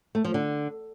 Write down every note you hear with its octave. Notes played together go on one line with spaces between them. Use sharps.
A3
F3
D3